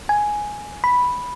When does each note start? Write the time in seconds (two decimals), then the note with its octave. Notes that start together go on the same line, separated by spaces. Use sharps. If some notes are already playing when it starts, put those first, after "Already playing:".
0.09 G#5
0.84 B5